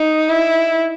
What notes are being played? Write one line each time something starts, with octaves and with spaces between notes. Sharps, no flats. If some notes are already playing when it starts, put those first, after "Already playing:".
Already playing: D#4
E4